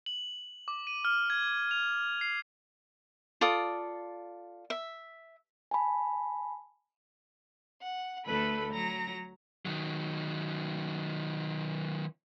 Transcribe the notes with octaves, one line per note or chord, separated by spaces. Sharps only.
F#7
D6
D#7
F6
G#6
F7
C7
F4 A4 D5 D#6
E5
G#5 A5 B5
F#5
D2 A3 A4 B4 B5
F#3 A#5 A#6
D#3 F#3